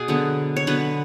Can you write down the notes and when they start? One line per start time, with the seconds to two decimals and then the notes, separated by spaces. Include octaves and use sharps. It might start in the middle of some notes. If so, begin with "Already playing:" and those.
Already playing: B2 G#4
0.08 D3 F#3 B3
0.56 C#5
0.67 D3 F#3 B3 B4